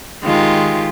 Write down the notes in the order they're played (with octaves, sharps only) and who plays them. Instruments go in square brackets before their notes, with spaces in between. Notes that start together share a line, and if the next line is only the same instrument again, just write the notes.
[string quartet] D#3 G#3 F4 G4